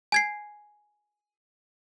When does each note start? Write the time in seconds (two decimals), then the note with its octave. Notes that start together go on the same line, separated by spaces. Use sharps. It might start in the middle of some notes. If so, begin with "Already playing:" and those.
0.12 G#5 G#6 C7